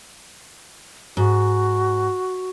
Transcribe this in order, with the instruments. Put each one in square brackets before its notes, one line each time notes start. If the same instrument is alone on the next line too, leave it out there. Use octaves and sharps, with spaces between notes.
[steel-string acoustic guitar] G#2 [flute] F#4